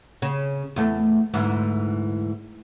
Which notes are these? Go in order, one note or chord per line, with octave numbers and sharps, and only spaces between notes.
C#3
E2 A3
D2 G#2 E3